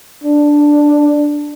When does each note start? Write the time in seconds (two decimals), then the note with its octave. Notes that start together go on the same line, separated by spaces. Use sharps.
0.24 D4